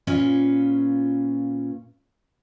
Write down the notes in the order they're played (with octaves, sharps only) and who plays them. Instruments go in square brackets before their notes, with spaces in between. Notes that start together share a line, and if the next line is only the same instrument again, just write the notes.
[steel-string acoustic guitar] A#2 C#4 F4 B4